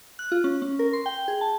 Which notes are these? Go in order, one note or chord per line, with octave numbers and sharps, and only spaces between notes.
F#6
F4
C#4
C#4
A#4
C6
G5
G#4
A5